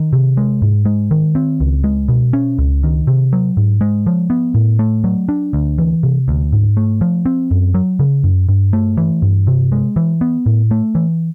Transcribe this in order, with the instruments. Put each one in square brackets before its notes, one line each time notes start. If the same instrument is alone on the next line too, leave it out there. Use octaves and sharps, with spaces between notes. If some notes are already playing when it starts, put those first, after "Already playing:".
Already playing: [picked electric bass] D#3
C3
G#3
G#2
G#3
D#3
C4
C#2
G#3
B2
C#4
C#2
D#3
C3
F#3
G#2
G#3
F3
B3
A2
A3
F#3
D4
D2
E3
C3
D2
G#2
A3
F3
C4
F#2
F#3
C#3
F#2
G2
A3
E3
G2
C3
G#3
E3
B3
A2
A3
E3